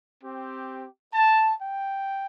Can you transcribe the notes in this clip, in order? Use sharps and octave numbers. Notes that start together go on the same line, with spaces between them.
C4 G4
A5
G5